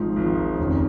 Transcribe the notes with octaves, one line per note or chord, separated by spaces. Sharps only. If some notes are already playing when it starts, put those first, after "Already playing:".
Already playing: G#1 G#2 F3 D#4
G#1 G#2 F3
F1 F2 D#3 C#4